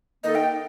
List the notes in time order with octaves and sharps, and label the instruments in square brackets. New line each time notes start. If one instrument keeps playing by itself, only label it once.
[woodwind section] D#3 A#3 D#4 A4 [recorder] D#5
[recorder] G5